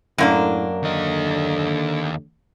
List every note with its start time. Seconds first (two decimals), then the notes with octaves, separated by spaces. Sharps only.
0.18 F#2 A2 A#3 D4
0.83 D#2 D3 D#5